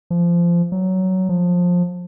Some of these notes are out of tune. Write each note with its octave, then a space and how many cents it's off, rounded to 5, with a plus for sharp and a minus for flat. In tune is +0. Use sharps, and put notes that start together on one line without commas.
F3 -20
F#3 +15
F3 +20